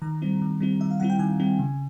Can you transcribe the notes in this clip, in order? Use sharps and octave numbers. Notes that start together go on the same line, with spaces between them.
D#3 A#5
G3 C4 E4
D#3
G3 C4 E4
D#3 E5
F5
G3 C4 E4 F#5
G5
D#3 G#5
G3 C4 E4
C#3